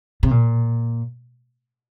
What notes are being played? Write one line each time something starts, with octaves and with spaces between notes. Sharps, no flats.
C3
A#2